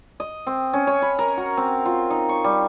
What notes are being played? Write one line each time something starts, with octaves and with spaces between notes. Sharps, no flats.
D#5
C4
C#4
C#5
B5
A#4
F#4
C4
F4
D#4
C#6
G3